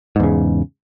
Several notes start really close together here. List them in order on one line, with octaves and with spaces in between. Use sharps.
G#2 E2 C#3